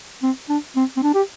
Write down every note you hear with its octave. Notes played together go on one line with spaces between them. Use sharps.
C4
D4
C4
C4
D4
G4